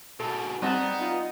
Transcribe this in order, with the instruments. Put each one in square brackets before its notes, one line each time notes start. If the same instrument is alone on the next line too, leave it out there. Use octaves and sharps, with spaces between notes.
[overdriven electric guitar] G#2 B2 [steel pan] A4
[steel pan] G3 C4 A5 [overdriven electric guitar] B3 [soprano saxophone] D#4 [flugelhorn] F#5
[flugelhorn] D#4 [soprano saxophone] F4